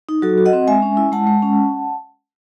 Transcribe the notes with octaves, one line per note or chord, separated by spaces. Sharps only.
D#4
F#3 F#4 A4
F#4
D#5 F#5
C4
G#3 E5 G#5
C#4
E4
G#3 F#5 A5
G#3
C#4